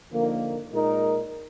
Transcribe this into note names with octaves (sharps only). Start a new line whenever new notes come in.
D3 F3 A#3 D#4
A#2 G#3 D#4 A#4